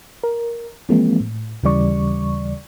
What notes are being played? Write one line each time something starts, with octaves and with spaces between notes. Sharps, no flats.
A#4
E3 F3 G#3 A#3 C4
A2
D#2 C#3 E3 G3 D5 C#6